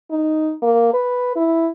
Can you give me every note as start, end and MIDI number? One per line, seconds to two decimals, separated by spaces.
0.11 0.54 63
0.62 0.91 58
0.93 1.32 71
1.36 1.69 64